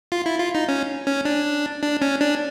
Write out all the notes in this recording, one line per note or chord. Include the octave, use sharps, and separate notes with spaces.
F4
E4
F4
D#4
C#4
C#4
D4
D4
C#4
D4